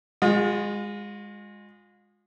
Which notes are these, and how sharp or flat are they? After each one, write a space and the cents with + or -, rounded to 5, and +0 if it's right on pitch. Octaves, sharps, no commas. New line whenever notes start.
G#3 -20 F4 +35